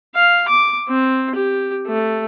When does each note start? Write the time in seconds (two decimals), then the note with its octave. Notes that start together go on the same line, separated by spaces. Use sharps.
0.15 F5
0.48 D6
0.88 C4
1.35 G4
1.87 A3